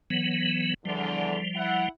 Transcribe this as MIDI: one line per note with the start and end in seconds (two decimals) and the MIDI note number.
0.10 0.74 52
0.10 0.74 54
0.10 0.74 59
0.85 1.38 40
0.85 1.38 50
0.85 1.89 53
0.85 1.89 55
1.56 1.87 64
1.56 1.87 78